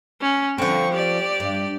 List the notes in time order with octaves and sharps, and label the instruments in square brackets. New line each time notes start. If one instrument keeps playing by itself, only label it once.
[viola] C#4
[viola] D3 C#6 [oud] F3 C4
[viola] G4 D5
[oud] G2